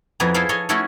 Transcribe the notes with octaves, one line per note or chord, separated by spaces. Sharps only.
F2 B3 E4 G#4 A#5
E4 G#4 A4 C5 F5
A4 C#5 D#5 G#5
A3 C#4 E4 F#4 G#4 A4